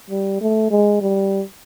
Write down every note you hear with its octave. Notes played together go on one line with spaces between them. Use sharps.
G3
A3
G#3
G3